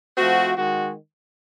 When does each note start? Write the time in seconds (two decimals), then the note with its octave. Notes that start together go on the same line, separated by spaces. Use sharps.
0.17 F3 A3 C4 F#4
0.56 D#3 G#3 F#4